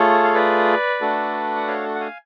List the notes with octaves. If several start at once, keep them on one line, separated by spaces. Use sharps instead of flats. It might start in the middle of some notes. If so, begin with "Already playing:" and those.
Already playing: A3 F4 G#4 A4 C#5
F5
B4 D5
A3 D4 F#4 A4
F#5
C#5 F5
F#5
F5 G#5